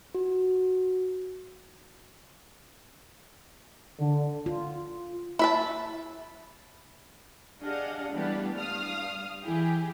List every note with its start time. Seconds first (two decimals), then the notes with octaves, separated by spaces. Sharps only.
0.15 F#4
4.00 D3
4.46 F4
5.39 E4 E5 A5
7.62 D4 G4 G#4 D#5 F5 F#5
8.13 E3 G3 A3 B3 D4 G4
8.58 G2 F5 D#6 F6
9.44 E3 E4 G4 G#4